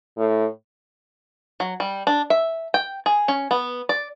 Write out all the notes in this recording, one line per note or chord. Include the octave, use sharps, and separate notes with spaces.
A2
F#3
G3
D4
E5
G5
G#4
C#4
B3
D5